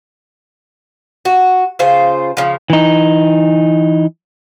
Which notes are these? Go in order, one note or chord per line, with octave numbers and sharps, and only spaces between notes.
F#4
C#3 F4 G#4 C5
C#3 F3
E3 D#4